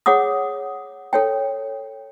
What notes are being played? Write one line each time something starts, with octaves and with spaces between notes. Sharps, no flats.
G#4 C#5 F#5 D6 D#6
A4 C#5 G5